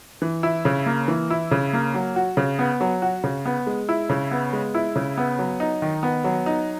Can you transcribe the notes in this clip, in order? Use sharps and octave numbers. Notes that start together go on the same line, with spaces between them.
E3
E4
C#3
A#3
E3
E4
C#3
A#3
F#3
F#4
C#3
B3
F#3
F#4
C#3
B3
G#3
E4
C#3
B3
G#3
E4
C#3
B3
F#3
D#4
D#3
B3
F#3
D#4